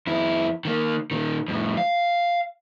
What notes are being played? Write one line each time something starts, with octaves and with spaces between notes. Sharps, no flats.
F2 E4
D#3 A#3
A#2 D#3
F2 A2
F5